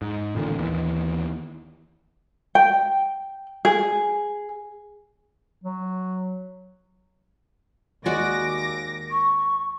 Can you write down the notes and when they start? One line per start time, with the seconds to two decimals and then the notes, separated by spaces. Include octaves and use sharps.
0.02 G#2
0.35 A1 A#2 D3 D#3
0.59 D#2 E3
2.55 G5
3.65 G#4
5.64 F#3
8.06 D#2 G#3 F#4 D5 D6 A#6
9.11 C#6